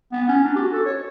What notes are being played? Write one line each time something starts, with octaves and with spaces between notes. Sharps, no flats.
B3
C#4
D4
G4
F#4
A4
C#5